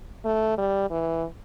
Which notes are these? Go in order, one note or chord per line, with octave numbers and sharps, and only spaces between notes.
A3
G3
E3